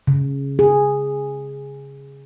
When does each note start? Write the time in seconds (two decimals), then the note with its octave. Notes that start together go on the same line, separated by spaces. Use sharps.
0.07 C#3
0.59 G#4